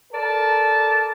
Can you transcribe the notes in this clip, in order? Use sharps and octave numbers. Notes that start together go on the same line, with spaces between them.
A4 A#4 D5 A5